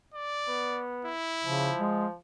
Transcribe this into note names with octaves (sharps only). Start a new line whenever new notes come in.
D5
B3
E4
C#3 F3
G#3